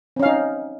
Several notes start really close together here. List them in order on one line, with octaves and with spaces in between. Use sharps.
C4 C#4 F5 D#4